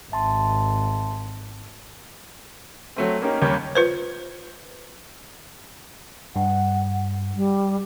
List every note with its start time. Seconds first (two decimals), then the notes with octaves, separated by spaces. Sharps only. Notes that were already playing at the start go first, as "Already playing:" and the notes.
0.12 G#1 E5 A5 C6
2.96 F#3 A3 C4
3.22 A#3 C#4 D#4 G4 A#4
3.42 D#2 G3 A#3 C#4 C#5 G6
3.75 F4 B4 C5
6.36 G2 F#5
7.36 G3